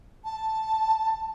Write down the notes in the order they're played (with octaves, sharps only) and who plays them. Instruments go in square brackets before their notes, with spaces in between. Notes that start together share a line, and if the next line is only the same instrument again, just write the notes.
[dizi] A5